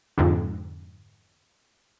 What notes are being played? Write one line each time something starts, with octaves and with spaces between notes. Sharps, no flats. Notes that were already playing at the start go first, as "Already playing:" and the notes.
F2 G#2 D3